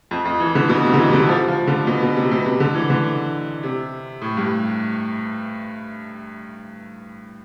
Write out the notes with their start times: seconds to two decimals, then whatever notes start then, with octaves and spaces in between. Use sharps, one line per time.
0.11 F2
0.25 F2
0.40 E3
0.55 D3
0.69 B2
0.85 C3
0.93 D3
0.99 E3
1.09 C3
1.13 D3
1.29 F3
1.48 F3
1.67 D3
1.87 B2
2.02 B2
2.16 C3
2.31 B2
2.46 C3
2.60 D3
2.75 E3
2.90 D3
3.63 C3
4.22 A2
4.37 G2